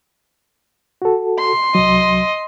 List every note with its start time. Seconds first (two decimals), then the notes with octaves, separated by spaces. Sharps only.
1.02 F#4 A4
1.39 C6
1.75 C2 F#3 D#5